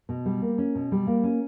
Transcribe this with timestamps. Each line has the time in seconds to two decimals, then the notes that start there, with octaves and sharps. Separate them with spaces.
0.09 B2
0.26 G3
0.42 A#3
0.58 C#4
0.75 B2
0.92 G3
1.07 A#3
1.24 C#4